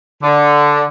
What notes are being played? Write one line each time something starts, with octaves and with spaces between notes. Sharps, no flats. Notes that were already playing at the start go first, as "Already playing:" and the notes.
D3